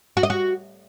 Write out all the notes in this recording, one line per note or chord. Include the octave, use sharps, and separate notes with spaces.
F#4
D#5
F#4